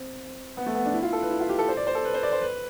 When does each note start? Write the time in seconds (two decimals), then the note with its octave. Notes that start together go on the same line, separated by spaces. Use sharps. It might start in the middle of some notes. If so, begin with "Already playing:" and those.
Already playing: C4
0.57 B3
0.66 A3
0.75 B3
0.85 D4
0.94 E4
1.03 F4
1.13 A4
1.22 B4
1.31 E4
1.40 F4
1.49 G4
1.59 A4
1.68 C5
1.77 D5
1.87 C5
1.95 A4
2.05 B4
2.14 C5
2.23 D5
2.32 C5
2.42 B4